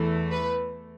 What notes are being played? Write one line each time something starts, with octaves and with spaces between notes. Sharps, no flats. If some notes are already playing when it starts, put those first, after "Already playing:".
Already playing: E2 E3 A3
B4